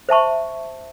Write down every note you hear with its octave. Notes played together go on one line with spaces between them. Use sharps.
C5 E5 A5 C#6